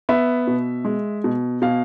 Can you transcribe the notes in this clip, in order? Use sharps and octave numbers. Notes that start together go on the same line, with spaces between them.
B3 E5
B2
G#3
B2
B2 F5